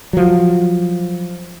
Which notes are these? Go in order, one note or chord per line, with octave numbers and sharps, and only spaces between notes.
F3 F#3